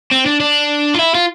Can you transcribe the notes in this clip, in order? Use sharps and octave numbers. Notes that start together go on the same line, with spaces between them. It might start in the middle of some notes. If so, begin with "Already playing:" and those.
C4
D4
D4
F4
E4
F4